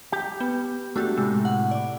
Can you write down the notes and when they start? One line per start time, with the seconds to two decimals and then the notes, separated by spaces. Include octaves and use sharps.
0.12 G4 G5
0.40 B3
0.96 A3 D4 F#4 G4
1.17 A2 C3 G#3
1.45 F#5
1.71 D5